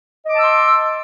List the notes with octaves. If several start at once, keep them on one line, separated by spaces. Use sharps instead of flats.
D#5 A5 C6 D6 E6